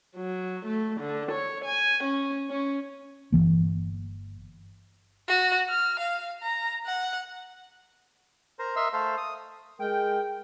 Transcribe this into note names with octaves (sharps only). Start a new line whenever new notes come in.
F#3
A3
D3
C#5
G#5
C#4
C#4
G1 F2 E3 A#3
F#4
F6
F5
A#5
F#5
A#4 C5 A#5
A#4 D#5 E5 C6 E6
A3 A4 C5 F5 C6
D#6
G#3 A#4 G5